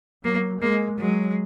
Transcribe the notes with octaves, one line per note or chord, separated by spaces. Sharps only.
F#3 A#3
G#3 A#3
F#3 G#3